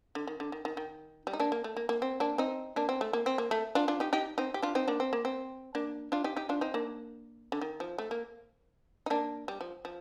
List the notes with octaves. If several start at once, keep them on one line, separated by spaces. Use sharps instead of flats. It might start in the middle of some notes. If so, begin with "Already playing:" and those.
D3
D#3
D3
D#3
D#3
D#3
G3
D#4
A#3 D4
A#3
A3
A#3
A#3
C4
A#3 D4
C4 D#4
A#3 D4
C4
A3
A#3
C4
A#3
A3
D4 F4
D4 F4
D#4 G4
D#4 G4
C4 D#4
G4
D4 F4
C4 D#4
A#3 D4
C4
A#3
C4
A#3 D4
D4 F4
D#4 G4
D#4 G4
D4 F4
C4 D#4
A#3 D4
D3
D#3
F3
A3
A#3
D#4
A#3 D4
G3
F3
F3